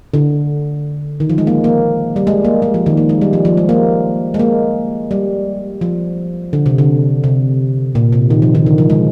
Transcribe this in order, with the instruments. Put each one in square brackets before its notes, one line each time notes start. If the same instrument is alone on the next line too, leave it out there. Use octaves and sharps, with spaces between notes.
[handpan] D3
D#3
F3
G#3
A#3
A#3
G3
G#3
A#3
G#3
F3
D#3
A#3
G#3
G3
F3
F3
G#3
A#3
G#3
A#3
G3
F3
D3
C3
D3
C3
A#2
C3
D#3
F3
D#3
D3
F3
G#3